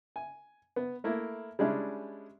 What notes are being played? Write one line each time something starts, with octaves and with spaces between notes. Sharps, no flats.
G#5
B3
A3 A#3 E4
G3 G#3 C#4 D4 E4